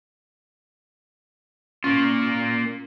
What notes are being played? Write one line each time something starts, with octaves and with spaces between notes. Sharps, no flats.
A#3 C#4 F4